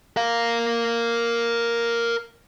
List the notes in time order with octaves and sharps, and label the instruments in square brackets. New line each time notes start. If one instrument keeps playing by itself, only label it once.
[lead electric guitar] A#4 F5